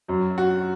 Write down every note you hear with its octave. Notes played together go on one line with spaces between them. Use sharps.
F#2 F#3
F#4